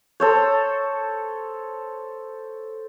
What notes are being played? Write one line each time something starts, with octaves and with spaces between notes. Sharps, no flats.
A4 C5 C#5